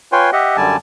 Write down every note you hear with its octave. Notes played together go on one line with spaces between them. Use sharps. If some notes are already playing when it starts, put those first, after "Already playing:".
F4 B4 C#5 G5 G#5 C6
G4 D#5 E5 F#5
F#2 D3 G3 D5 G#5 A5